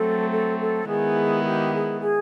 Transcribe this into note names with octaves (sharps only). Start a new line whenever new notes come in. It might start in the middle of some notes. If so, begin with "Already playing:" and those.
Already playing: F#3 A3 C4 A4
A4
A4
D#3 G#3 B3 E4 G#4
G4
G#4
G#4